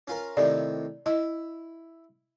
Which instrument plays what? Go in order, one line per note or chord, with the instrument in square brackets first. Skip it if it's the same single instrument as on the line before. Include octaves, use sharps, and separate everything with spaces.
[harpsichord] C#4 F4 A#4
[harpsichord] A2 C3 D#3 [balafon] D5
[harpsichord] E4 [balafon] D#5